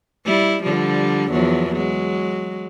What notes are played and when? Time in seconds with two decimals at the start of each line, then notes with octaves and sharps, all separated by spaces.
0.25 G3 E4
0.63 D3 F3 G3
1.31 E2 F3 F#3
1.75 F#3 G#3